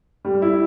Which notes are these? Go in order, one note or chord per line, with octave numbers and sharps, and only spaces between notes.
G3
E4